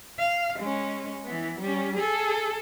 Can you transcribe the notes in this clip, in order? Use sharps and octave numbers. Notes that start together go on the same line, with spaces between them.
F5
G#3 C#4
E3 B3
G3 C#4
G#4 A4